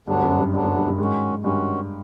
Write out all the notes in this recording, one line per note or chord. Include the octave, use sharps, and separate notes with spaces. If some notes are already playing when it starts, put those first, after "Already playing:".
D2 G2 D3 F#3 B3 D4
F#2
G2
D2 G2 D3 F#3 B3 D4
G2
G2
G2
G#2 D#3 G#3 C#4 F#4
G2 D#3 G#3 C#4 F#4